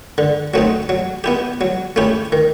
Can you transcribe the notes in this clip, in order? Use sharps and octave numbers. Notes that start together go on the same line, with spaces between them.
D3
F#3 A3 C4 D#4
F#3
B3 E4 G4
F#3
A3 C#4 E4 G4
D#3